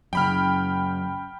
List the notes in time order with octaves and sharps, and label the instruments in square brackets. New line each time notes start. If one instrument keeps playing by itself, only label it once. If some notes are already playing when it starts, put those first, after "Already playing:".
[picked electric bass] F#2 C#3 [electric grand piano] G5 B5 F6